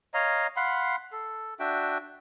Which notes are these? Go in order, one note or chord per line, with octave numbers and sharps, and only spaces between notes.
C#5 D#5 F5 A#5
F5 F#5 B5 C6
A4
D4 F#4 E5 G5